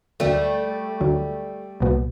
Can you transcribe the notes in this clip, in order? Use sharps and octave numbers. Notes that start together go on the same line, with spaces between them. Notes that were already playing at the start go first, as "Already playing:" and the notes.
D2 D3 F#3 G3 A3
D2 D3 F#3
C2 A#2 F#3 B3